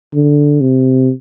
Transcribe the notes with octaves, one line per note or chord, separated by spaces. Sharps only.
D3
C3